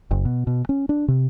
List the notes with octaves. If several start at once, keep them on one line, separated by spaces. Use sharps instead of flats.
F#1
B2
B2
C#4
D4
C3